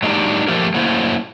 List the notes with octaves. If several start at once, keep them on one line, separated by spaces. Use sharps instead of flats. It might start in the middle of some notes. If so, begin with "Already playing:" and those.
F#3 G#3 A#3 D4 D#4 G4
F3 A3 A#3 G4 A#4
F#3 A3 A#3 C#4 E4 C5